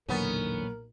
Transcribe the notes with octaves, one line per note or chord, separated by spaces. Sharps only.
B1 E2 A#2 D3 D#3 B3 C#4 A#4